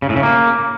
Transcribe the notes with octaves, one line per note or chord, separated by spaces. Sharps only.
C#3
A2
C#3
A#3